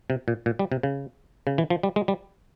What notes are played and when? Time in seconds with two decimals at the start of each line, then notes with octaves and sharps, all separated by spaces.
0.10 C3
0.28 A#2
0.46 A#2
0.59 G3
0.72 C3
0.83 C#3
1.47 C#3
1.58 E3
1.70 F3
1.83 G3
1.96 G#3
2.08 G3